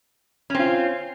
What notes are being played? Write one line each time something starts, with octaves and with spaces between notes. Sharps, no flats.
C4 C#4 F4